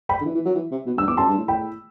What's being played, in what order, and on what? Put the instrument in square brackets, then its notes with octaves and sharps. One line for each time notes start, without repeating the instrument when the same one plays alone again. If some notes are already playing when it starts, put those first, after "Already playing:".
[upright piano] G5 B5
[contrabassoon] D3
E3
E3
F#3
E3
C3
B2
[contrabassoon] G2 [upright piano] E6
[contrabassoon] E2 [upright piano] D6
[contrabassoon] F#2 [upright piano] A5 C6
[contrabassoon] G2
A2
[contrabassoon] A2 [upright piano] G5 B5